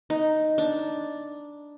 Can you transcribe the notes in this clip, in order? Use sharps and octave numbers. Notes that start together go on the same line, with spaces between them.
D#4
D4